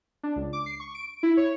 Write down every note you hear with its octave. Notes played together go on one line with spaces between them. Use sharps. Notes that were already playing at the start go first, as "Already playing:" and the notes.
D4
C#2
D6
C7
C#6
D7
E4
C#5